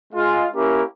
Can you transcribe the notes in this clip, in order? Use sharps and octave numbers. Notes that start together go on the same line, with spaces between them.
G#3 F4
A#3 C#4 E4 G4 A#4